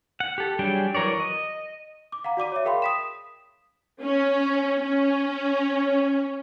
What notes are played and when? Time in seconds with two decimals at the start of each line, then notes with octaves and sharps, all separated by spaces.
0.20 F#5
0.38 G4 A4
0.59 F#3 G3 D4 G#4 G5
0.95 E3 F#3 A#4 C#5 D5
1.20 D#5
2.12 D6
2.24 F5 F#5 A#5
2.37 F#4 D5 D6 D#7
2.52 C#5 E5
2.65 G#4 A#4 F5 G5 B5 C6
2.82 D#6 B6 E7
4.01 C#4
4.83 C#4